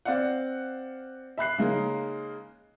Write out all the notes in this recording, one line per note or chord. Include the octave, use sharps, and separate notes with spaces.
C4 D5 F5 F#5
E5 B5 F#6 C7
C#3 G#3 A#3 D#4